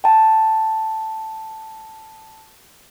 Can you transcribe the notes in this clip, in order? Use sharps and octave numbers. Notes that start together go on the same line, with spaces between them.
G5 A5